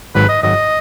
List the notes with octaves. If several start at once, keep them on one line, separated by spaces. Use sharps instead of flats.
G#1 G#2 F#3 B4
D#5
G#1 G#2 F#3 D#5